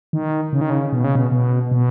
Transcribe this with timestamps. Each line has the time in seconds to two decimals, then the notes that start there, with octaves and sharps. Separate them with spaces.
0.13 D#3
0.53 C#3
0.61 D#3
0.70 C#3
0.93 B2
1.04 C#3
1.15 B2
1.32 B2
1.71 B2